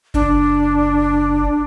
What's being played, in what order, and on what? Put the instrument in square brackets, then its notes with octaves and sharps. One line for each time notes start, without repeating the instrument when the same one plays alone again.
[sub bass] F#1 [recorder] D4